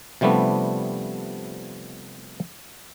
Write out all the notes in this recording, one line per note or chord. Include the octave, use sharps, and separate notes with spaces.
C3 F3 G3 A3 B3 D4